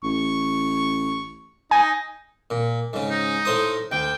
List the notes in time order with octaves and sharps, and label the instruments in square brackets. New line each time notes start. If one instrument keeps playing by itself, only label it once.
[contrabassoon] A1 [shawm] C#6
[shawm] D#4 [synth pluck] G#5
[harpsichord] A#2
G#2 C#3
[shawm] D#4
[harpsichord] A2 C5 D#6
[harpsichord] D2 [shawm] G5